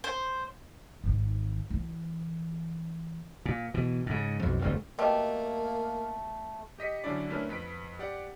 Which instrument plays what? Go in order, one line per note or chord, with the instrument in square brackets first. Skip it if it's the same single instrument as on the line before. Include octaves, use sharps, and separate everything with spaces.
[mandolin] C5
[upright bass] G#1 D#3
E3
[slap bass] A#2
B2 E3
G#2 C#3
B1 F2
E1 G2 D3 A3
[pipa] B2 A3 G4 [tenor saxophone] A#3
[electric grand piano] G4 D#5 B6 C#7
D3 F#3 C#4 D4 E4 D5
A3 C#4 D4 E4 A#4 B4
F2 B4 B6 D7
G4 D5 F#5